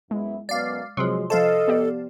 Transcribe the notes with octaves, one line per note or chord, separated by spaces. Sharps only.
F#2 G#3 B3 E4
F#2 B2 D5 F5
C3 F3 F#3 G#3 C6
F3 A4 C5 D#5 F5 A5
B3 G4 D5